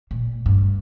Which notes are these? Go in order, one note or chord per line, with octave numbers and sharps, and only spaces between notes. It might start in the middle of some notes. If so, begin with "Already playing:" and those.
A#2
G2